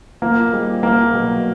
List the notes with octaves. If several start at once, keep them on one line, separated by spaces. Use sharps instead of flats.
A#2 A#3
G3 C4 D#4 G#4
C2 A#3
B2 F#3